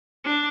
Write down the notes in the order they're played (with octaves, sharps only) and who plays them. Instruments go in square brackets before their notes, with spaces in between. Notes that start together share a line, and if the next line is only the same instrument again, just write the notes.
[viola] D4